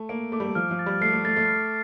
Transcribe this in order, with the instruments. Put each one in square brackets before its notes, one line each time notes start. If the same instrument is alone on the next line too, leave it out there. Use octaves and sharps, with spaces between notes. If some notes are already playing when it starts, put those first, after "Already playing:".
Already playing: [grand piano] A3
[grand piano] A#3 [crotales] D7
[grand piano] A3 [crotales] D6
[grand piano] G3
A3
[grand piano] F3 [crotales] F6
[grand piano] F3
[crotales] A6
[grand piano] G3
[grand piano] A3 [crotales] C7
[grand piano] A3
[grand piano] A3 [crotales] A6
[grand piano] A3
[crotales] F6